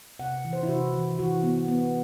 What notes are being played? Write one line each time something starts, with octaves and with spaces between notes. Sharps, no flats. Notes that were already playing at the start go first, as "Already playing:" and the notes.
C3 F#5
E3
C5
E4
C3 F#4
E3
E3 F#4
B3
B3